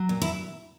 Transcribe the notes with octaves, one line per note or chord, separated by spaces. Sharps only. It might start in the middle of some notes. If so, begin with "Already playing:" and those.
Already playing: F#3
A#2
E4